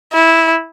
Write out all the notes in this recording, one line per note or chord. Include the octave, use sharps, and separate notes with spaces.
E4